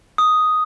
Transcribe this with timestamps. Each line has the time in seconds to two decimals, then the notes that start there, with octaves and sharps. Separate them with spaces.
0.18 D#6